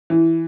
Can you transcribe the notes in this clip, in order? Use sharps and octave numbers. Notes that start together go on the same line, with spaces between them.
E3